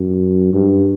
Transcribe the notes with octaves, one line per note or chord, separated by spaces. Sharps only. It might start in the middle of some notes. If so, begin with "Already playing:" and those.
Already playing: F#2
G2